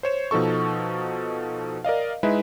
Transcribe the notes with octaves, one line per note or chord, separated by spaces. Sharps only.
C5 C#5 E7
B2 F3 D#4 A4 C#6
A#4 D5 D#5 F5
G#3 D#4 E4 B4 E5